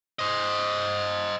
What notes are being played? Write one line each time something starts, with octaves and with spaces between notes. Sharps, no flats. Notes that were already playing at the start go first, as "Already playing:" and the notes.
C5 D#5